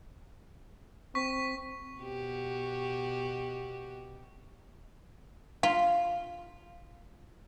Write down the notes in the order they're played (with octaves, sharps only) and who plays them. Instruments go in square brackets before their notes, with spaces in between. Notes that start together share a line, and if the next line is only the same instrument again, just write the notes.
[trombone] C4 [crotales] C#6 B6
[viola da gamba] B2 F#4 G4
[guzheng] F4 [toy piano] F5